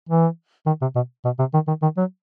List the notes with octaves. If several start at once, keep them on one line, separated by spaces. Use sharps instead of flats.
E3
D#3
C3
B2
B2
C3
D#3
D#3
D#3
F#3